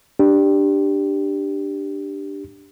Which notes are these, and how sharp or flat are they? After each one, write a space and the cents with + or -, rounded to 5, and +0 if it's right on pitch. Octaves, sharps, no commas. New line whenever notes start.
D4 +5 G4 +0